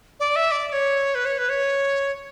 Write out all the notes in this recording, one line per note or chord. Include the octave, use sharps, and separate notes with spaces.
D5
E5
D5
D5
C#5
B4
C#5
B4
C#5